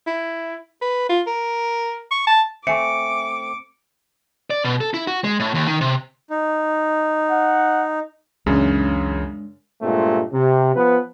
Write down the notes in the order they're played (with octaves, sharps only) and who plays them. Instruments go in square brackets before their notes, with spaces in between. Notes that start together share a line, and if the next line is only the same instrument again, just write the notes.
[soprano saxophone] E4
B4
F4
A#4
C#6
A5
[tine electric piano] A3 C4 [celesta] E5 G#5 C#6 [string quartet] D6 [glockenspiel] C#7
[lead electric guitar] D5
B2
A4
E4
F#4
G#3
A2
D#2
D#3
C3
[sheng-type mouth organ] D#4
[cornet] F#5
[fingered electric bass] C#2 E3 C#4 [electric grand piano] F#2 C#3 [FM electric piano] G#3 D4
[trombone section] G2 A#2 G#3 A3 C4
C3
F3 B3 B4